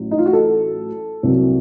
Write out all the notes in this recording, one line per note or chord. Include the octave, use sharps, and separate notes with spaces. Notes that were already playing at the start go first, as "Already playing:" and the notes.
Already playing: A1 A2 F#3
D#4
F4
F#4
A4
C2 C3 F#3 A#3